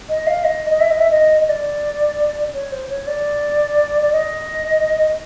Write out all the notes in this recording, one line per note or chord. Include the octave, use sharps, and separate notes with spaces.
D#5
F5
D#5
D#5
E5
D#5
E5
D#5
D#5
D5
C#5
C5
C#5
D5
D5
D#5